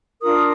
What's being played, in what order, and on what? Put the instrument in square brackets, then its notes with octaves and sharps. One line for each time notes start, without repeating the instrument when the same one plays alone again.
[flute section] D4 F4 A#4 D#6